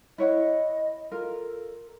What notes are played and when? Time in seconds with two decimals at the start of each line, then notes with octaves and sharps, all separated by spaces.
0.18 E4 C#5 D#5 F#5
1.12 F4 A4 A#4